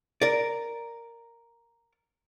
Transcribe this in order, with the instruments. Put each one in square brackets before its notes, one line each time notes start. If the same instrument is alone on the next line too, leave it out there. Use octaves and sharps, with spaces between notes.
[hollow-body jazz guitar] A#4 D5